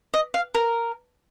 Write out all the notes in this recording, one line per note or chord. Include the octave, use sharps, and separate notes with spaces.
D#5
F5
A#4